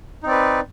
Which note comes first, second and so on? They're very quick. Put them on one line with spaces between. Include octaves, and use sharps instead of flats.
D#4 C4 D5 B4